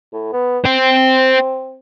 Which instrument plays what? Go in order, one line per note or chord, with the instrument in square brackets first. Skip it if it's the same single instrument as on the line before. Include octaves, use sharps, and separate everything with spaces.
[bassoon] A2
B3
[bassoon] C4 [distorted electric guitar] C5 G5